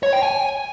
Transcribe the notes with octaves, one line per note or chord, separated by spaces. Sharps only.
C#5
G5
G#5